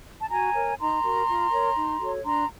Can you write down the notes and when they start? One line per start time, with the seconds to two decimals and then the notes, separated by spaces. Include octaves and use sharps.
0.20 A5
0.29 F#4 G#5 A#5
0.53 A#4 C#5
0.78 D#4 A#5 C6
1.02 F#4 A#4
1.28 F4
1.51 A#4 C#5
1.75 D#4
2.00 F#4 A4 C#5
2.24 D4 A#5 C6